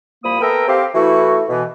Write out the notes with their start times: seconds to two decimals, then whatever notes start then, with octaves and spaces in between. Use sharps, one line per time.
0.24 C2 F3 A#3 B5 D#6
0.40 B3 A4 A#4 E5 G5 A#5
0.68 C4 G4 F5
0.94 E3 A3 E4 F#4
1.49 B2 E3